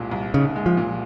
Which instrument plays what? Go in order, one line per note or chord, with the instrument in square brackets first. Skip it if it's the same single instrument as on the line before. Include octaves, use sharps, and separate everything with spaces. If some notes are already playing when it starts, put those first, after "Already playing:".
Already playing: [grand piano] C2 A#2 G#3
C2
[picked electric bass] C#3 [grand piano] D#4
[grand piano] G#3
[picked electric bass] F3
[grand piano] A#2